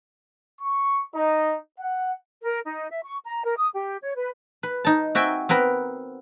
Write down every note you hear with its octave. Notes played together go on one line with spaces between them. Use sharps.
C#6
D#4
F#5
A#4
D#4
E5
C#6
A#5
A#4
D#6
G4
C#5
B4
B4
D#4 A5
C4 F#4 E5 G5 G#5
B3 C4 A#4 B4 A#5